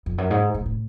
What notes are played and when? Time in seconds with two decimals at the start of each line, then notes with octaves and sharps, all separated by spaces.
0.06 F2
0.18 F#2
0.30 G#2
0.54 G#2
0.66 A2